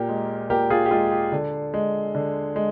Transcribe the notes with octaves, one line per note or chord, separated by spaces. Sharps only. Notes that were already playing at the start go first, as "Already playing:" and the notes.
Already playing: A#2 G4 A#4
G#3
A#2 G4 A#4
F4 G#4
G4
G#3 F4
G4
D3
G#3
D3
G#3